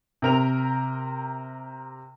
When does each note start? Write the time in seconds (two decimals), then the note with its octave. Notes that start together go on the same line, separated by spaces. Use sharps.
0.22 C3 A#4 F7